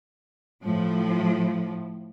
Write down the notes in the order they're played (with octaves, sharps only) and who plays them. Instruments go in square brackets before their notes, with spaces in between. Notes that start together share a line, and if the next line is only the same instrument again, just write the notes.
[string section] A2 F3